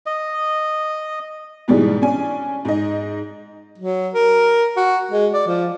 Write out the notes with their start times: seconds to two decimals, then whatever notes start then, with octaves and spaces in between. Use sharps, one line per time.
0.06 D#5
1.68 G#2 B2 E3 G3 G#3
2.02 C#4 D4 G#5
2.65 G#2 D#5
3.78 F#3
4.14 A#4
4.77 F#4
5.11 G#3
5.33 D5
5.47 F3